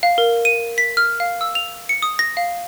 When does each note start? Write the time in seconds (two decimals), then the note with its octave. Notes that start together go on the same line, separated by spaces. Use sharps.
0.03 F5
0.18 A#4
0.45 D#7
0.78 B6
0.97 F6
1.20 F5
1.41 E6
1.55 F7
1.89 C#7
2.02 D#6
2.19 A#6
2.37 F5